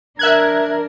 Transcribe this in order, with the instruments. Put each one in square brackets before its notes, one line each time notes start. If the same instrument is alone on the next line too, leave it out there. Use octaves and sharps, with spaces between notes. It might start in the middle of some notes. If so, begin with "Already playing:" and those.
[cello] D4 A#4 [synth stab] E5 F#6 G#6